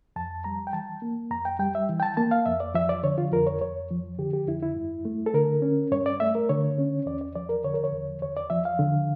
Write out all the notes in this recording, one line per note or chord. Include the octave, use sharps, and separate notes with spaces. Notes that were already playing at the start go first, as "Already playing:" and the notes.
F2 A5
G3 A#5
G5
E3 A5
A#3
F2 A#5
G5
G3 G5
E5
E3
G5
A5
A#3 A5
F5
F2 E5
D5
F3 E5
D5
D3 C#5
F4
F2 A#4
C#5
F2 C#5
F3
D3 G4
G4
F2 E4
E4
G2
A3
A4
D3 A#4
C#4
G2 C#5
D5
A3 E5
A#4
D3 C#5
C#4
E2 D5
D5
F3 D5
A#4
D3 C#5
A#4
C#5
E2
E2 C#5
D5
F3 E5
F5
D3